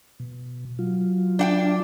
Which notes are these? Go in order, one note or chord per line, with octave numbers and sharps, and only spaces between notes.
B2
F#3 F4
D4 F#5 G5